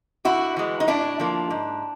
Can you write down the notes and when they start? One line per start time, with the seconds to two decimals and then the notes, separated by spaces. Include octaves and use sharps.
0.25 G2 E4 F#4
0.57 E3 G#3
0.80 D#4
0.87 A2 D4 E4
1.20 F3 A#3
1.50 G#2